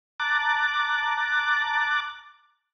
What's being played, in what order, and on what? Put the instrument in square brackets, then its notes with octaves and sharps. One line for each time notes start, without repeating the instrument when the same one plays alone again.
[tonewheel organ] A5 A#5 D6 F#6 A6